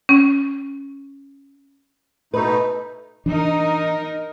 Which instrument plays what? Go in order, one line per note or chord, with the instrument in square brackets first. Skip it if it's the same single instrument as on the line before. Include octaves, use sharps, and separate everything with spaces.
[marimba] C#4
[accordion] B2 A3 D#4 [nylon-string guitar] B4
[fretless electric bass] E3 D4 [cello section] D#4 A#4